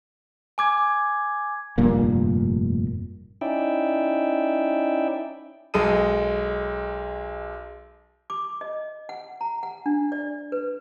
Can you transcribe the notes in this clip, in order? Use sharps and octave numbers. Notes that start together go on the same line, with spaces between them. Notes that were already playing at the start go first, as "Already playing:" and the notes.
G#5 D6 G#6
F1 G2 A#2 A#3
C#4 D#4 E4 D5 E5 G5
B1 G#3 A4 D#6 D#7
D6
D#5
F#5
A#5
F#5
D4
D5
B4